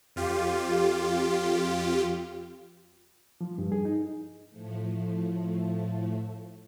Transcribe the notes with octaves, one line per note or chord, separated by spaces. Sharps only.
F2 F4 G4
F3
G2
G#4
D#4
A2 F3 A3